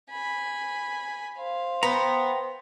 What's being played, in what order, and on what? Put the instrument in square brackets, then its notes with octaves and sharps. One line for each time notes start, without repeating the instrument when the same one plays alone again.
[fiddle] G#5 B5
[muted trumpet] C5 [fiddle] F5
[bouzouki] B3 [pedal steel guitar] G5 A#5